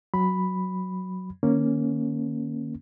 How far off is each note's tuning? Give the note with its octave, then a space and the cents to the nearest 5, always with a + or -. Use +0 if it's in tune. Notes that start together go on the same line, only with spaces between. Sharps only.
F#3 +0 B5 +0
D#3 -35 A#3 +0 C#4 -5